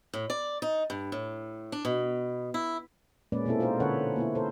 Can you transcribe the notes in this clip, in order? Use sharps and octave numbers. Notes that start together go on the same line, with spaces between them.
A2
D5
D#4
G2
A2
D4
B2
E4
A#2 G#3 A#3 C#4 B4 D5
B2 A#3 C4 E4 A4
D#4 F4 G#4 A#4 C5
D3 C#4 A4 B4 C#5 F#5
A#3 B3 E4
A4 A#4 C5